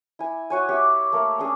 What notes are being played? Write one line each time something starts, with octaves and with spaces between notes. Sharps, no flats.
E4 G#5
F#4 C#5 G#5
G4 C#5 E5
A3 A#3 A#4
C#4 D4 G#4 G#5